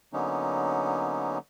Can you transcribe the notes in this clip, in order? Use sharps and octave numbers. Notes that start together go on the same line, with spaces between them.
D3 F#3 A#3 B3 C#4 D#4